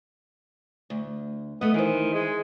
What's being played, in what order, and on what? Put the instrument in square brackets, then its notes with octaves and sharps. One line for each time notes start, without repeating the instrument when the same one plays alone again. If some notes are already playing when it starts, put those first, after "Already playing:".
[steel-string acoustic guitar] D2
[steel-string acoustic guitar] A3 D#5 [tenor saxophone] B3
[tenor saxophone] D#3 [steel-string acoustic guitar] E3 C5
[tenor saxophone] G#3